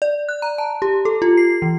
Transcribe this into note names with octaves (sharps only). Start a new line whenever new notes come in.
D5
F#6
A#5
A5
G4
A4
F4
C7
E3